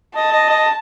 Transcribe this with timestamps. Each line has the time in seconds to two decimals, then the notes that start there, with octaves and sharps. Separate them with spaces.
0.16 D#5 A5
0.33 D#5
0.50 D#5